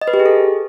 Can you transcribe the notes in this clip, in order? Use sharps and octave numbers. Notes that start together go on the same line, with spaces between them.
D#5
B4
G4
G#4
A4